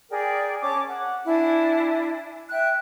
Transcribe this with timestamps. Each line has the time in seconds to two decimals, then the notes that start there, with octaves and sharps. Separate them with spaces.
0.10 G#4 A#4 D5 G5
0.62 C#4 A5 D6
0.88 F#5
1.25 D4 E4 G#5
2.50 E5 G5 F#6